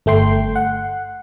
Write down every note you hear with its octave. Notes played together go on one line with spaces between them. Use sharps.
G1 A3 G5 C6
F#5